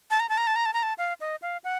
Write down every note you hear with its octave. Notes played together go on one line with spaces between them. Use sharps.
A5
A#5
A5
A#5
A5
A#5
A5
A#5
A5
F5
D#5
F5
F#5